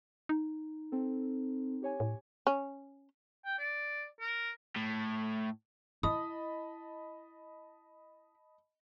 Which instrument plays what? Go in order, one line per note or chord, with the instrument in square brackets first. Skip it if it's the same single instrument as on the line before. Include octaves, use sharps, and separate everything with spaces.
[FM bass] D#4
[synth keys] C4 A4
G4 C#5 G#5
[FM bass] A2
[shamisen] C#4
[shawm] G5
D5
A#4
[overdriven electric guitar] A2
[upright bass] E4 [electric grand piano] D#5 A5 B5 [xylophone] D#6